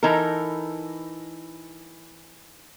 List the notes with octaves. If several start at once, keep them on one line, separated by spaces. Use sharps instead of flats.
E3 D#4 A4 A#4